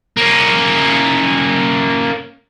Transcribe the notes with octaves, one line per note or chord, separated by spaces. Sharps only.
A#3 C#4